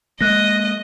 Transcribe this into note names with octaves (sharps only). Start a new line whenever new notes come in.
G#3 A#3 D#5 F#6 A#6